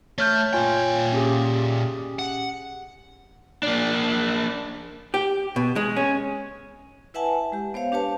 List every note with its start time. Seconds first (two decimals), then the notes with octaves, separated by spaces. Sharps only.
0.18 A3 C#5 F6 G6
0.53 A#2 F4 C#5 G5 G#5
1.12 C#4 G4 G#4
2.19 F#5
3.63 A#3 D4
5.14 G4
5.56 B2
5.76 G#3
5.96 C#4
7.14 E4 B4 E5 F#5 G#5 A5
7.52 G#3 G4
7.74 B3 C5 C#5 F5
7.92 D4 G4 B4 C#5 A5